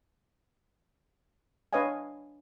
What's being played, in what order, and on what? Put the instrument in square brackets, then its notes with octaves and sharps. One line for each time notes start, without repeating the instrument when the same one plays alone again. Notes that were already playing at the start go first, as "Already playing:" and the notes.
[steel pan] D4 B4 C#5 D#5 F5 G#5